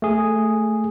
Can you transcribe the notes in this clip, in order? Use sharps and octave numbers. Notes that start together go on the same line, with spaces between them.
A3 G#4